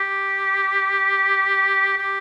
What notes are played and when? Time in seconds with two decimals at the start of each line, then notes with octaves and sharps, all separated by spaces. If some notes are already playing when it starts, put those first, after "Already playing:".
Already playing: G4
1.98 G4